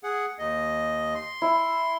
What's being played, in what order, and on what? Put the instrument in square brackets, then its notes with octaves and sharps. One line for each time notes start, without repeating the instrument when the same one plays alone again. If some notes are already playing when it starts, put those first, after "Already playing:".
[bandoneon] G#4 F#5
D#2 D#5
C6
[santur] E4